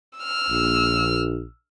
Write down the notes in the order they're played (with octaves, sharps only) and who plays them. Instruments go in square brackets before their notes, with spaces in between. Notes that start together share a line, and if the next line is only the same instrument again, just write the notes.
[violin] E6 F6
[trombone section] A#1